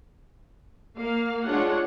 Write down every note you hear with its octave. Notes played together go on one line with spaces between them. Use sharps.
A#3 F5
G#3 D4 F4 C#5 F#5